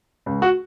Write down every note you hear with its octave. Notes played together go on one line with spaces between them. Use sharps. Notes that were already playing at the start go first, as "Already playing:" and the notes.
C#2
F#4